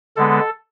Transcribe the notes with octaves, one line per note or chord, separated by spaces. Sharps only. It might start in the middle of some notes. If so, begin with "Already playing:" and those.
D3 G#3 B3 A4